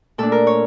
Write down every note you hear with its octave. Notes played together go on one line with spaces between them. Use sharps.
A#2 A3 D4 A4
A#4
C#5